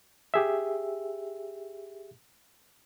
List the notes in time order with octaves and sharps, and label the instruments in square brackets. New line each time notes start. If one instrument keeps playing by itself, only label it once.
[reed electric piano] G4 G#4 E5